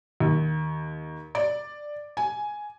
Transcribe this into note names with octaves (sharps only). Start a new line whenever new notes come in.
D#2
D5
G#5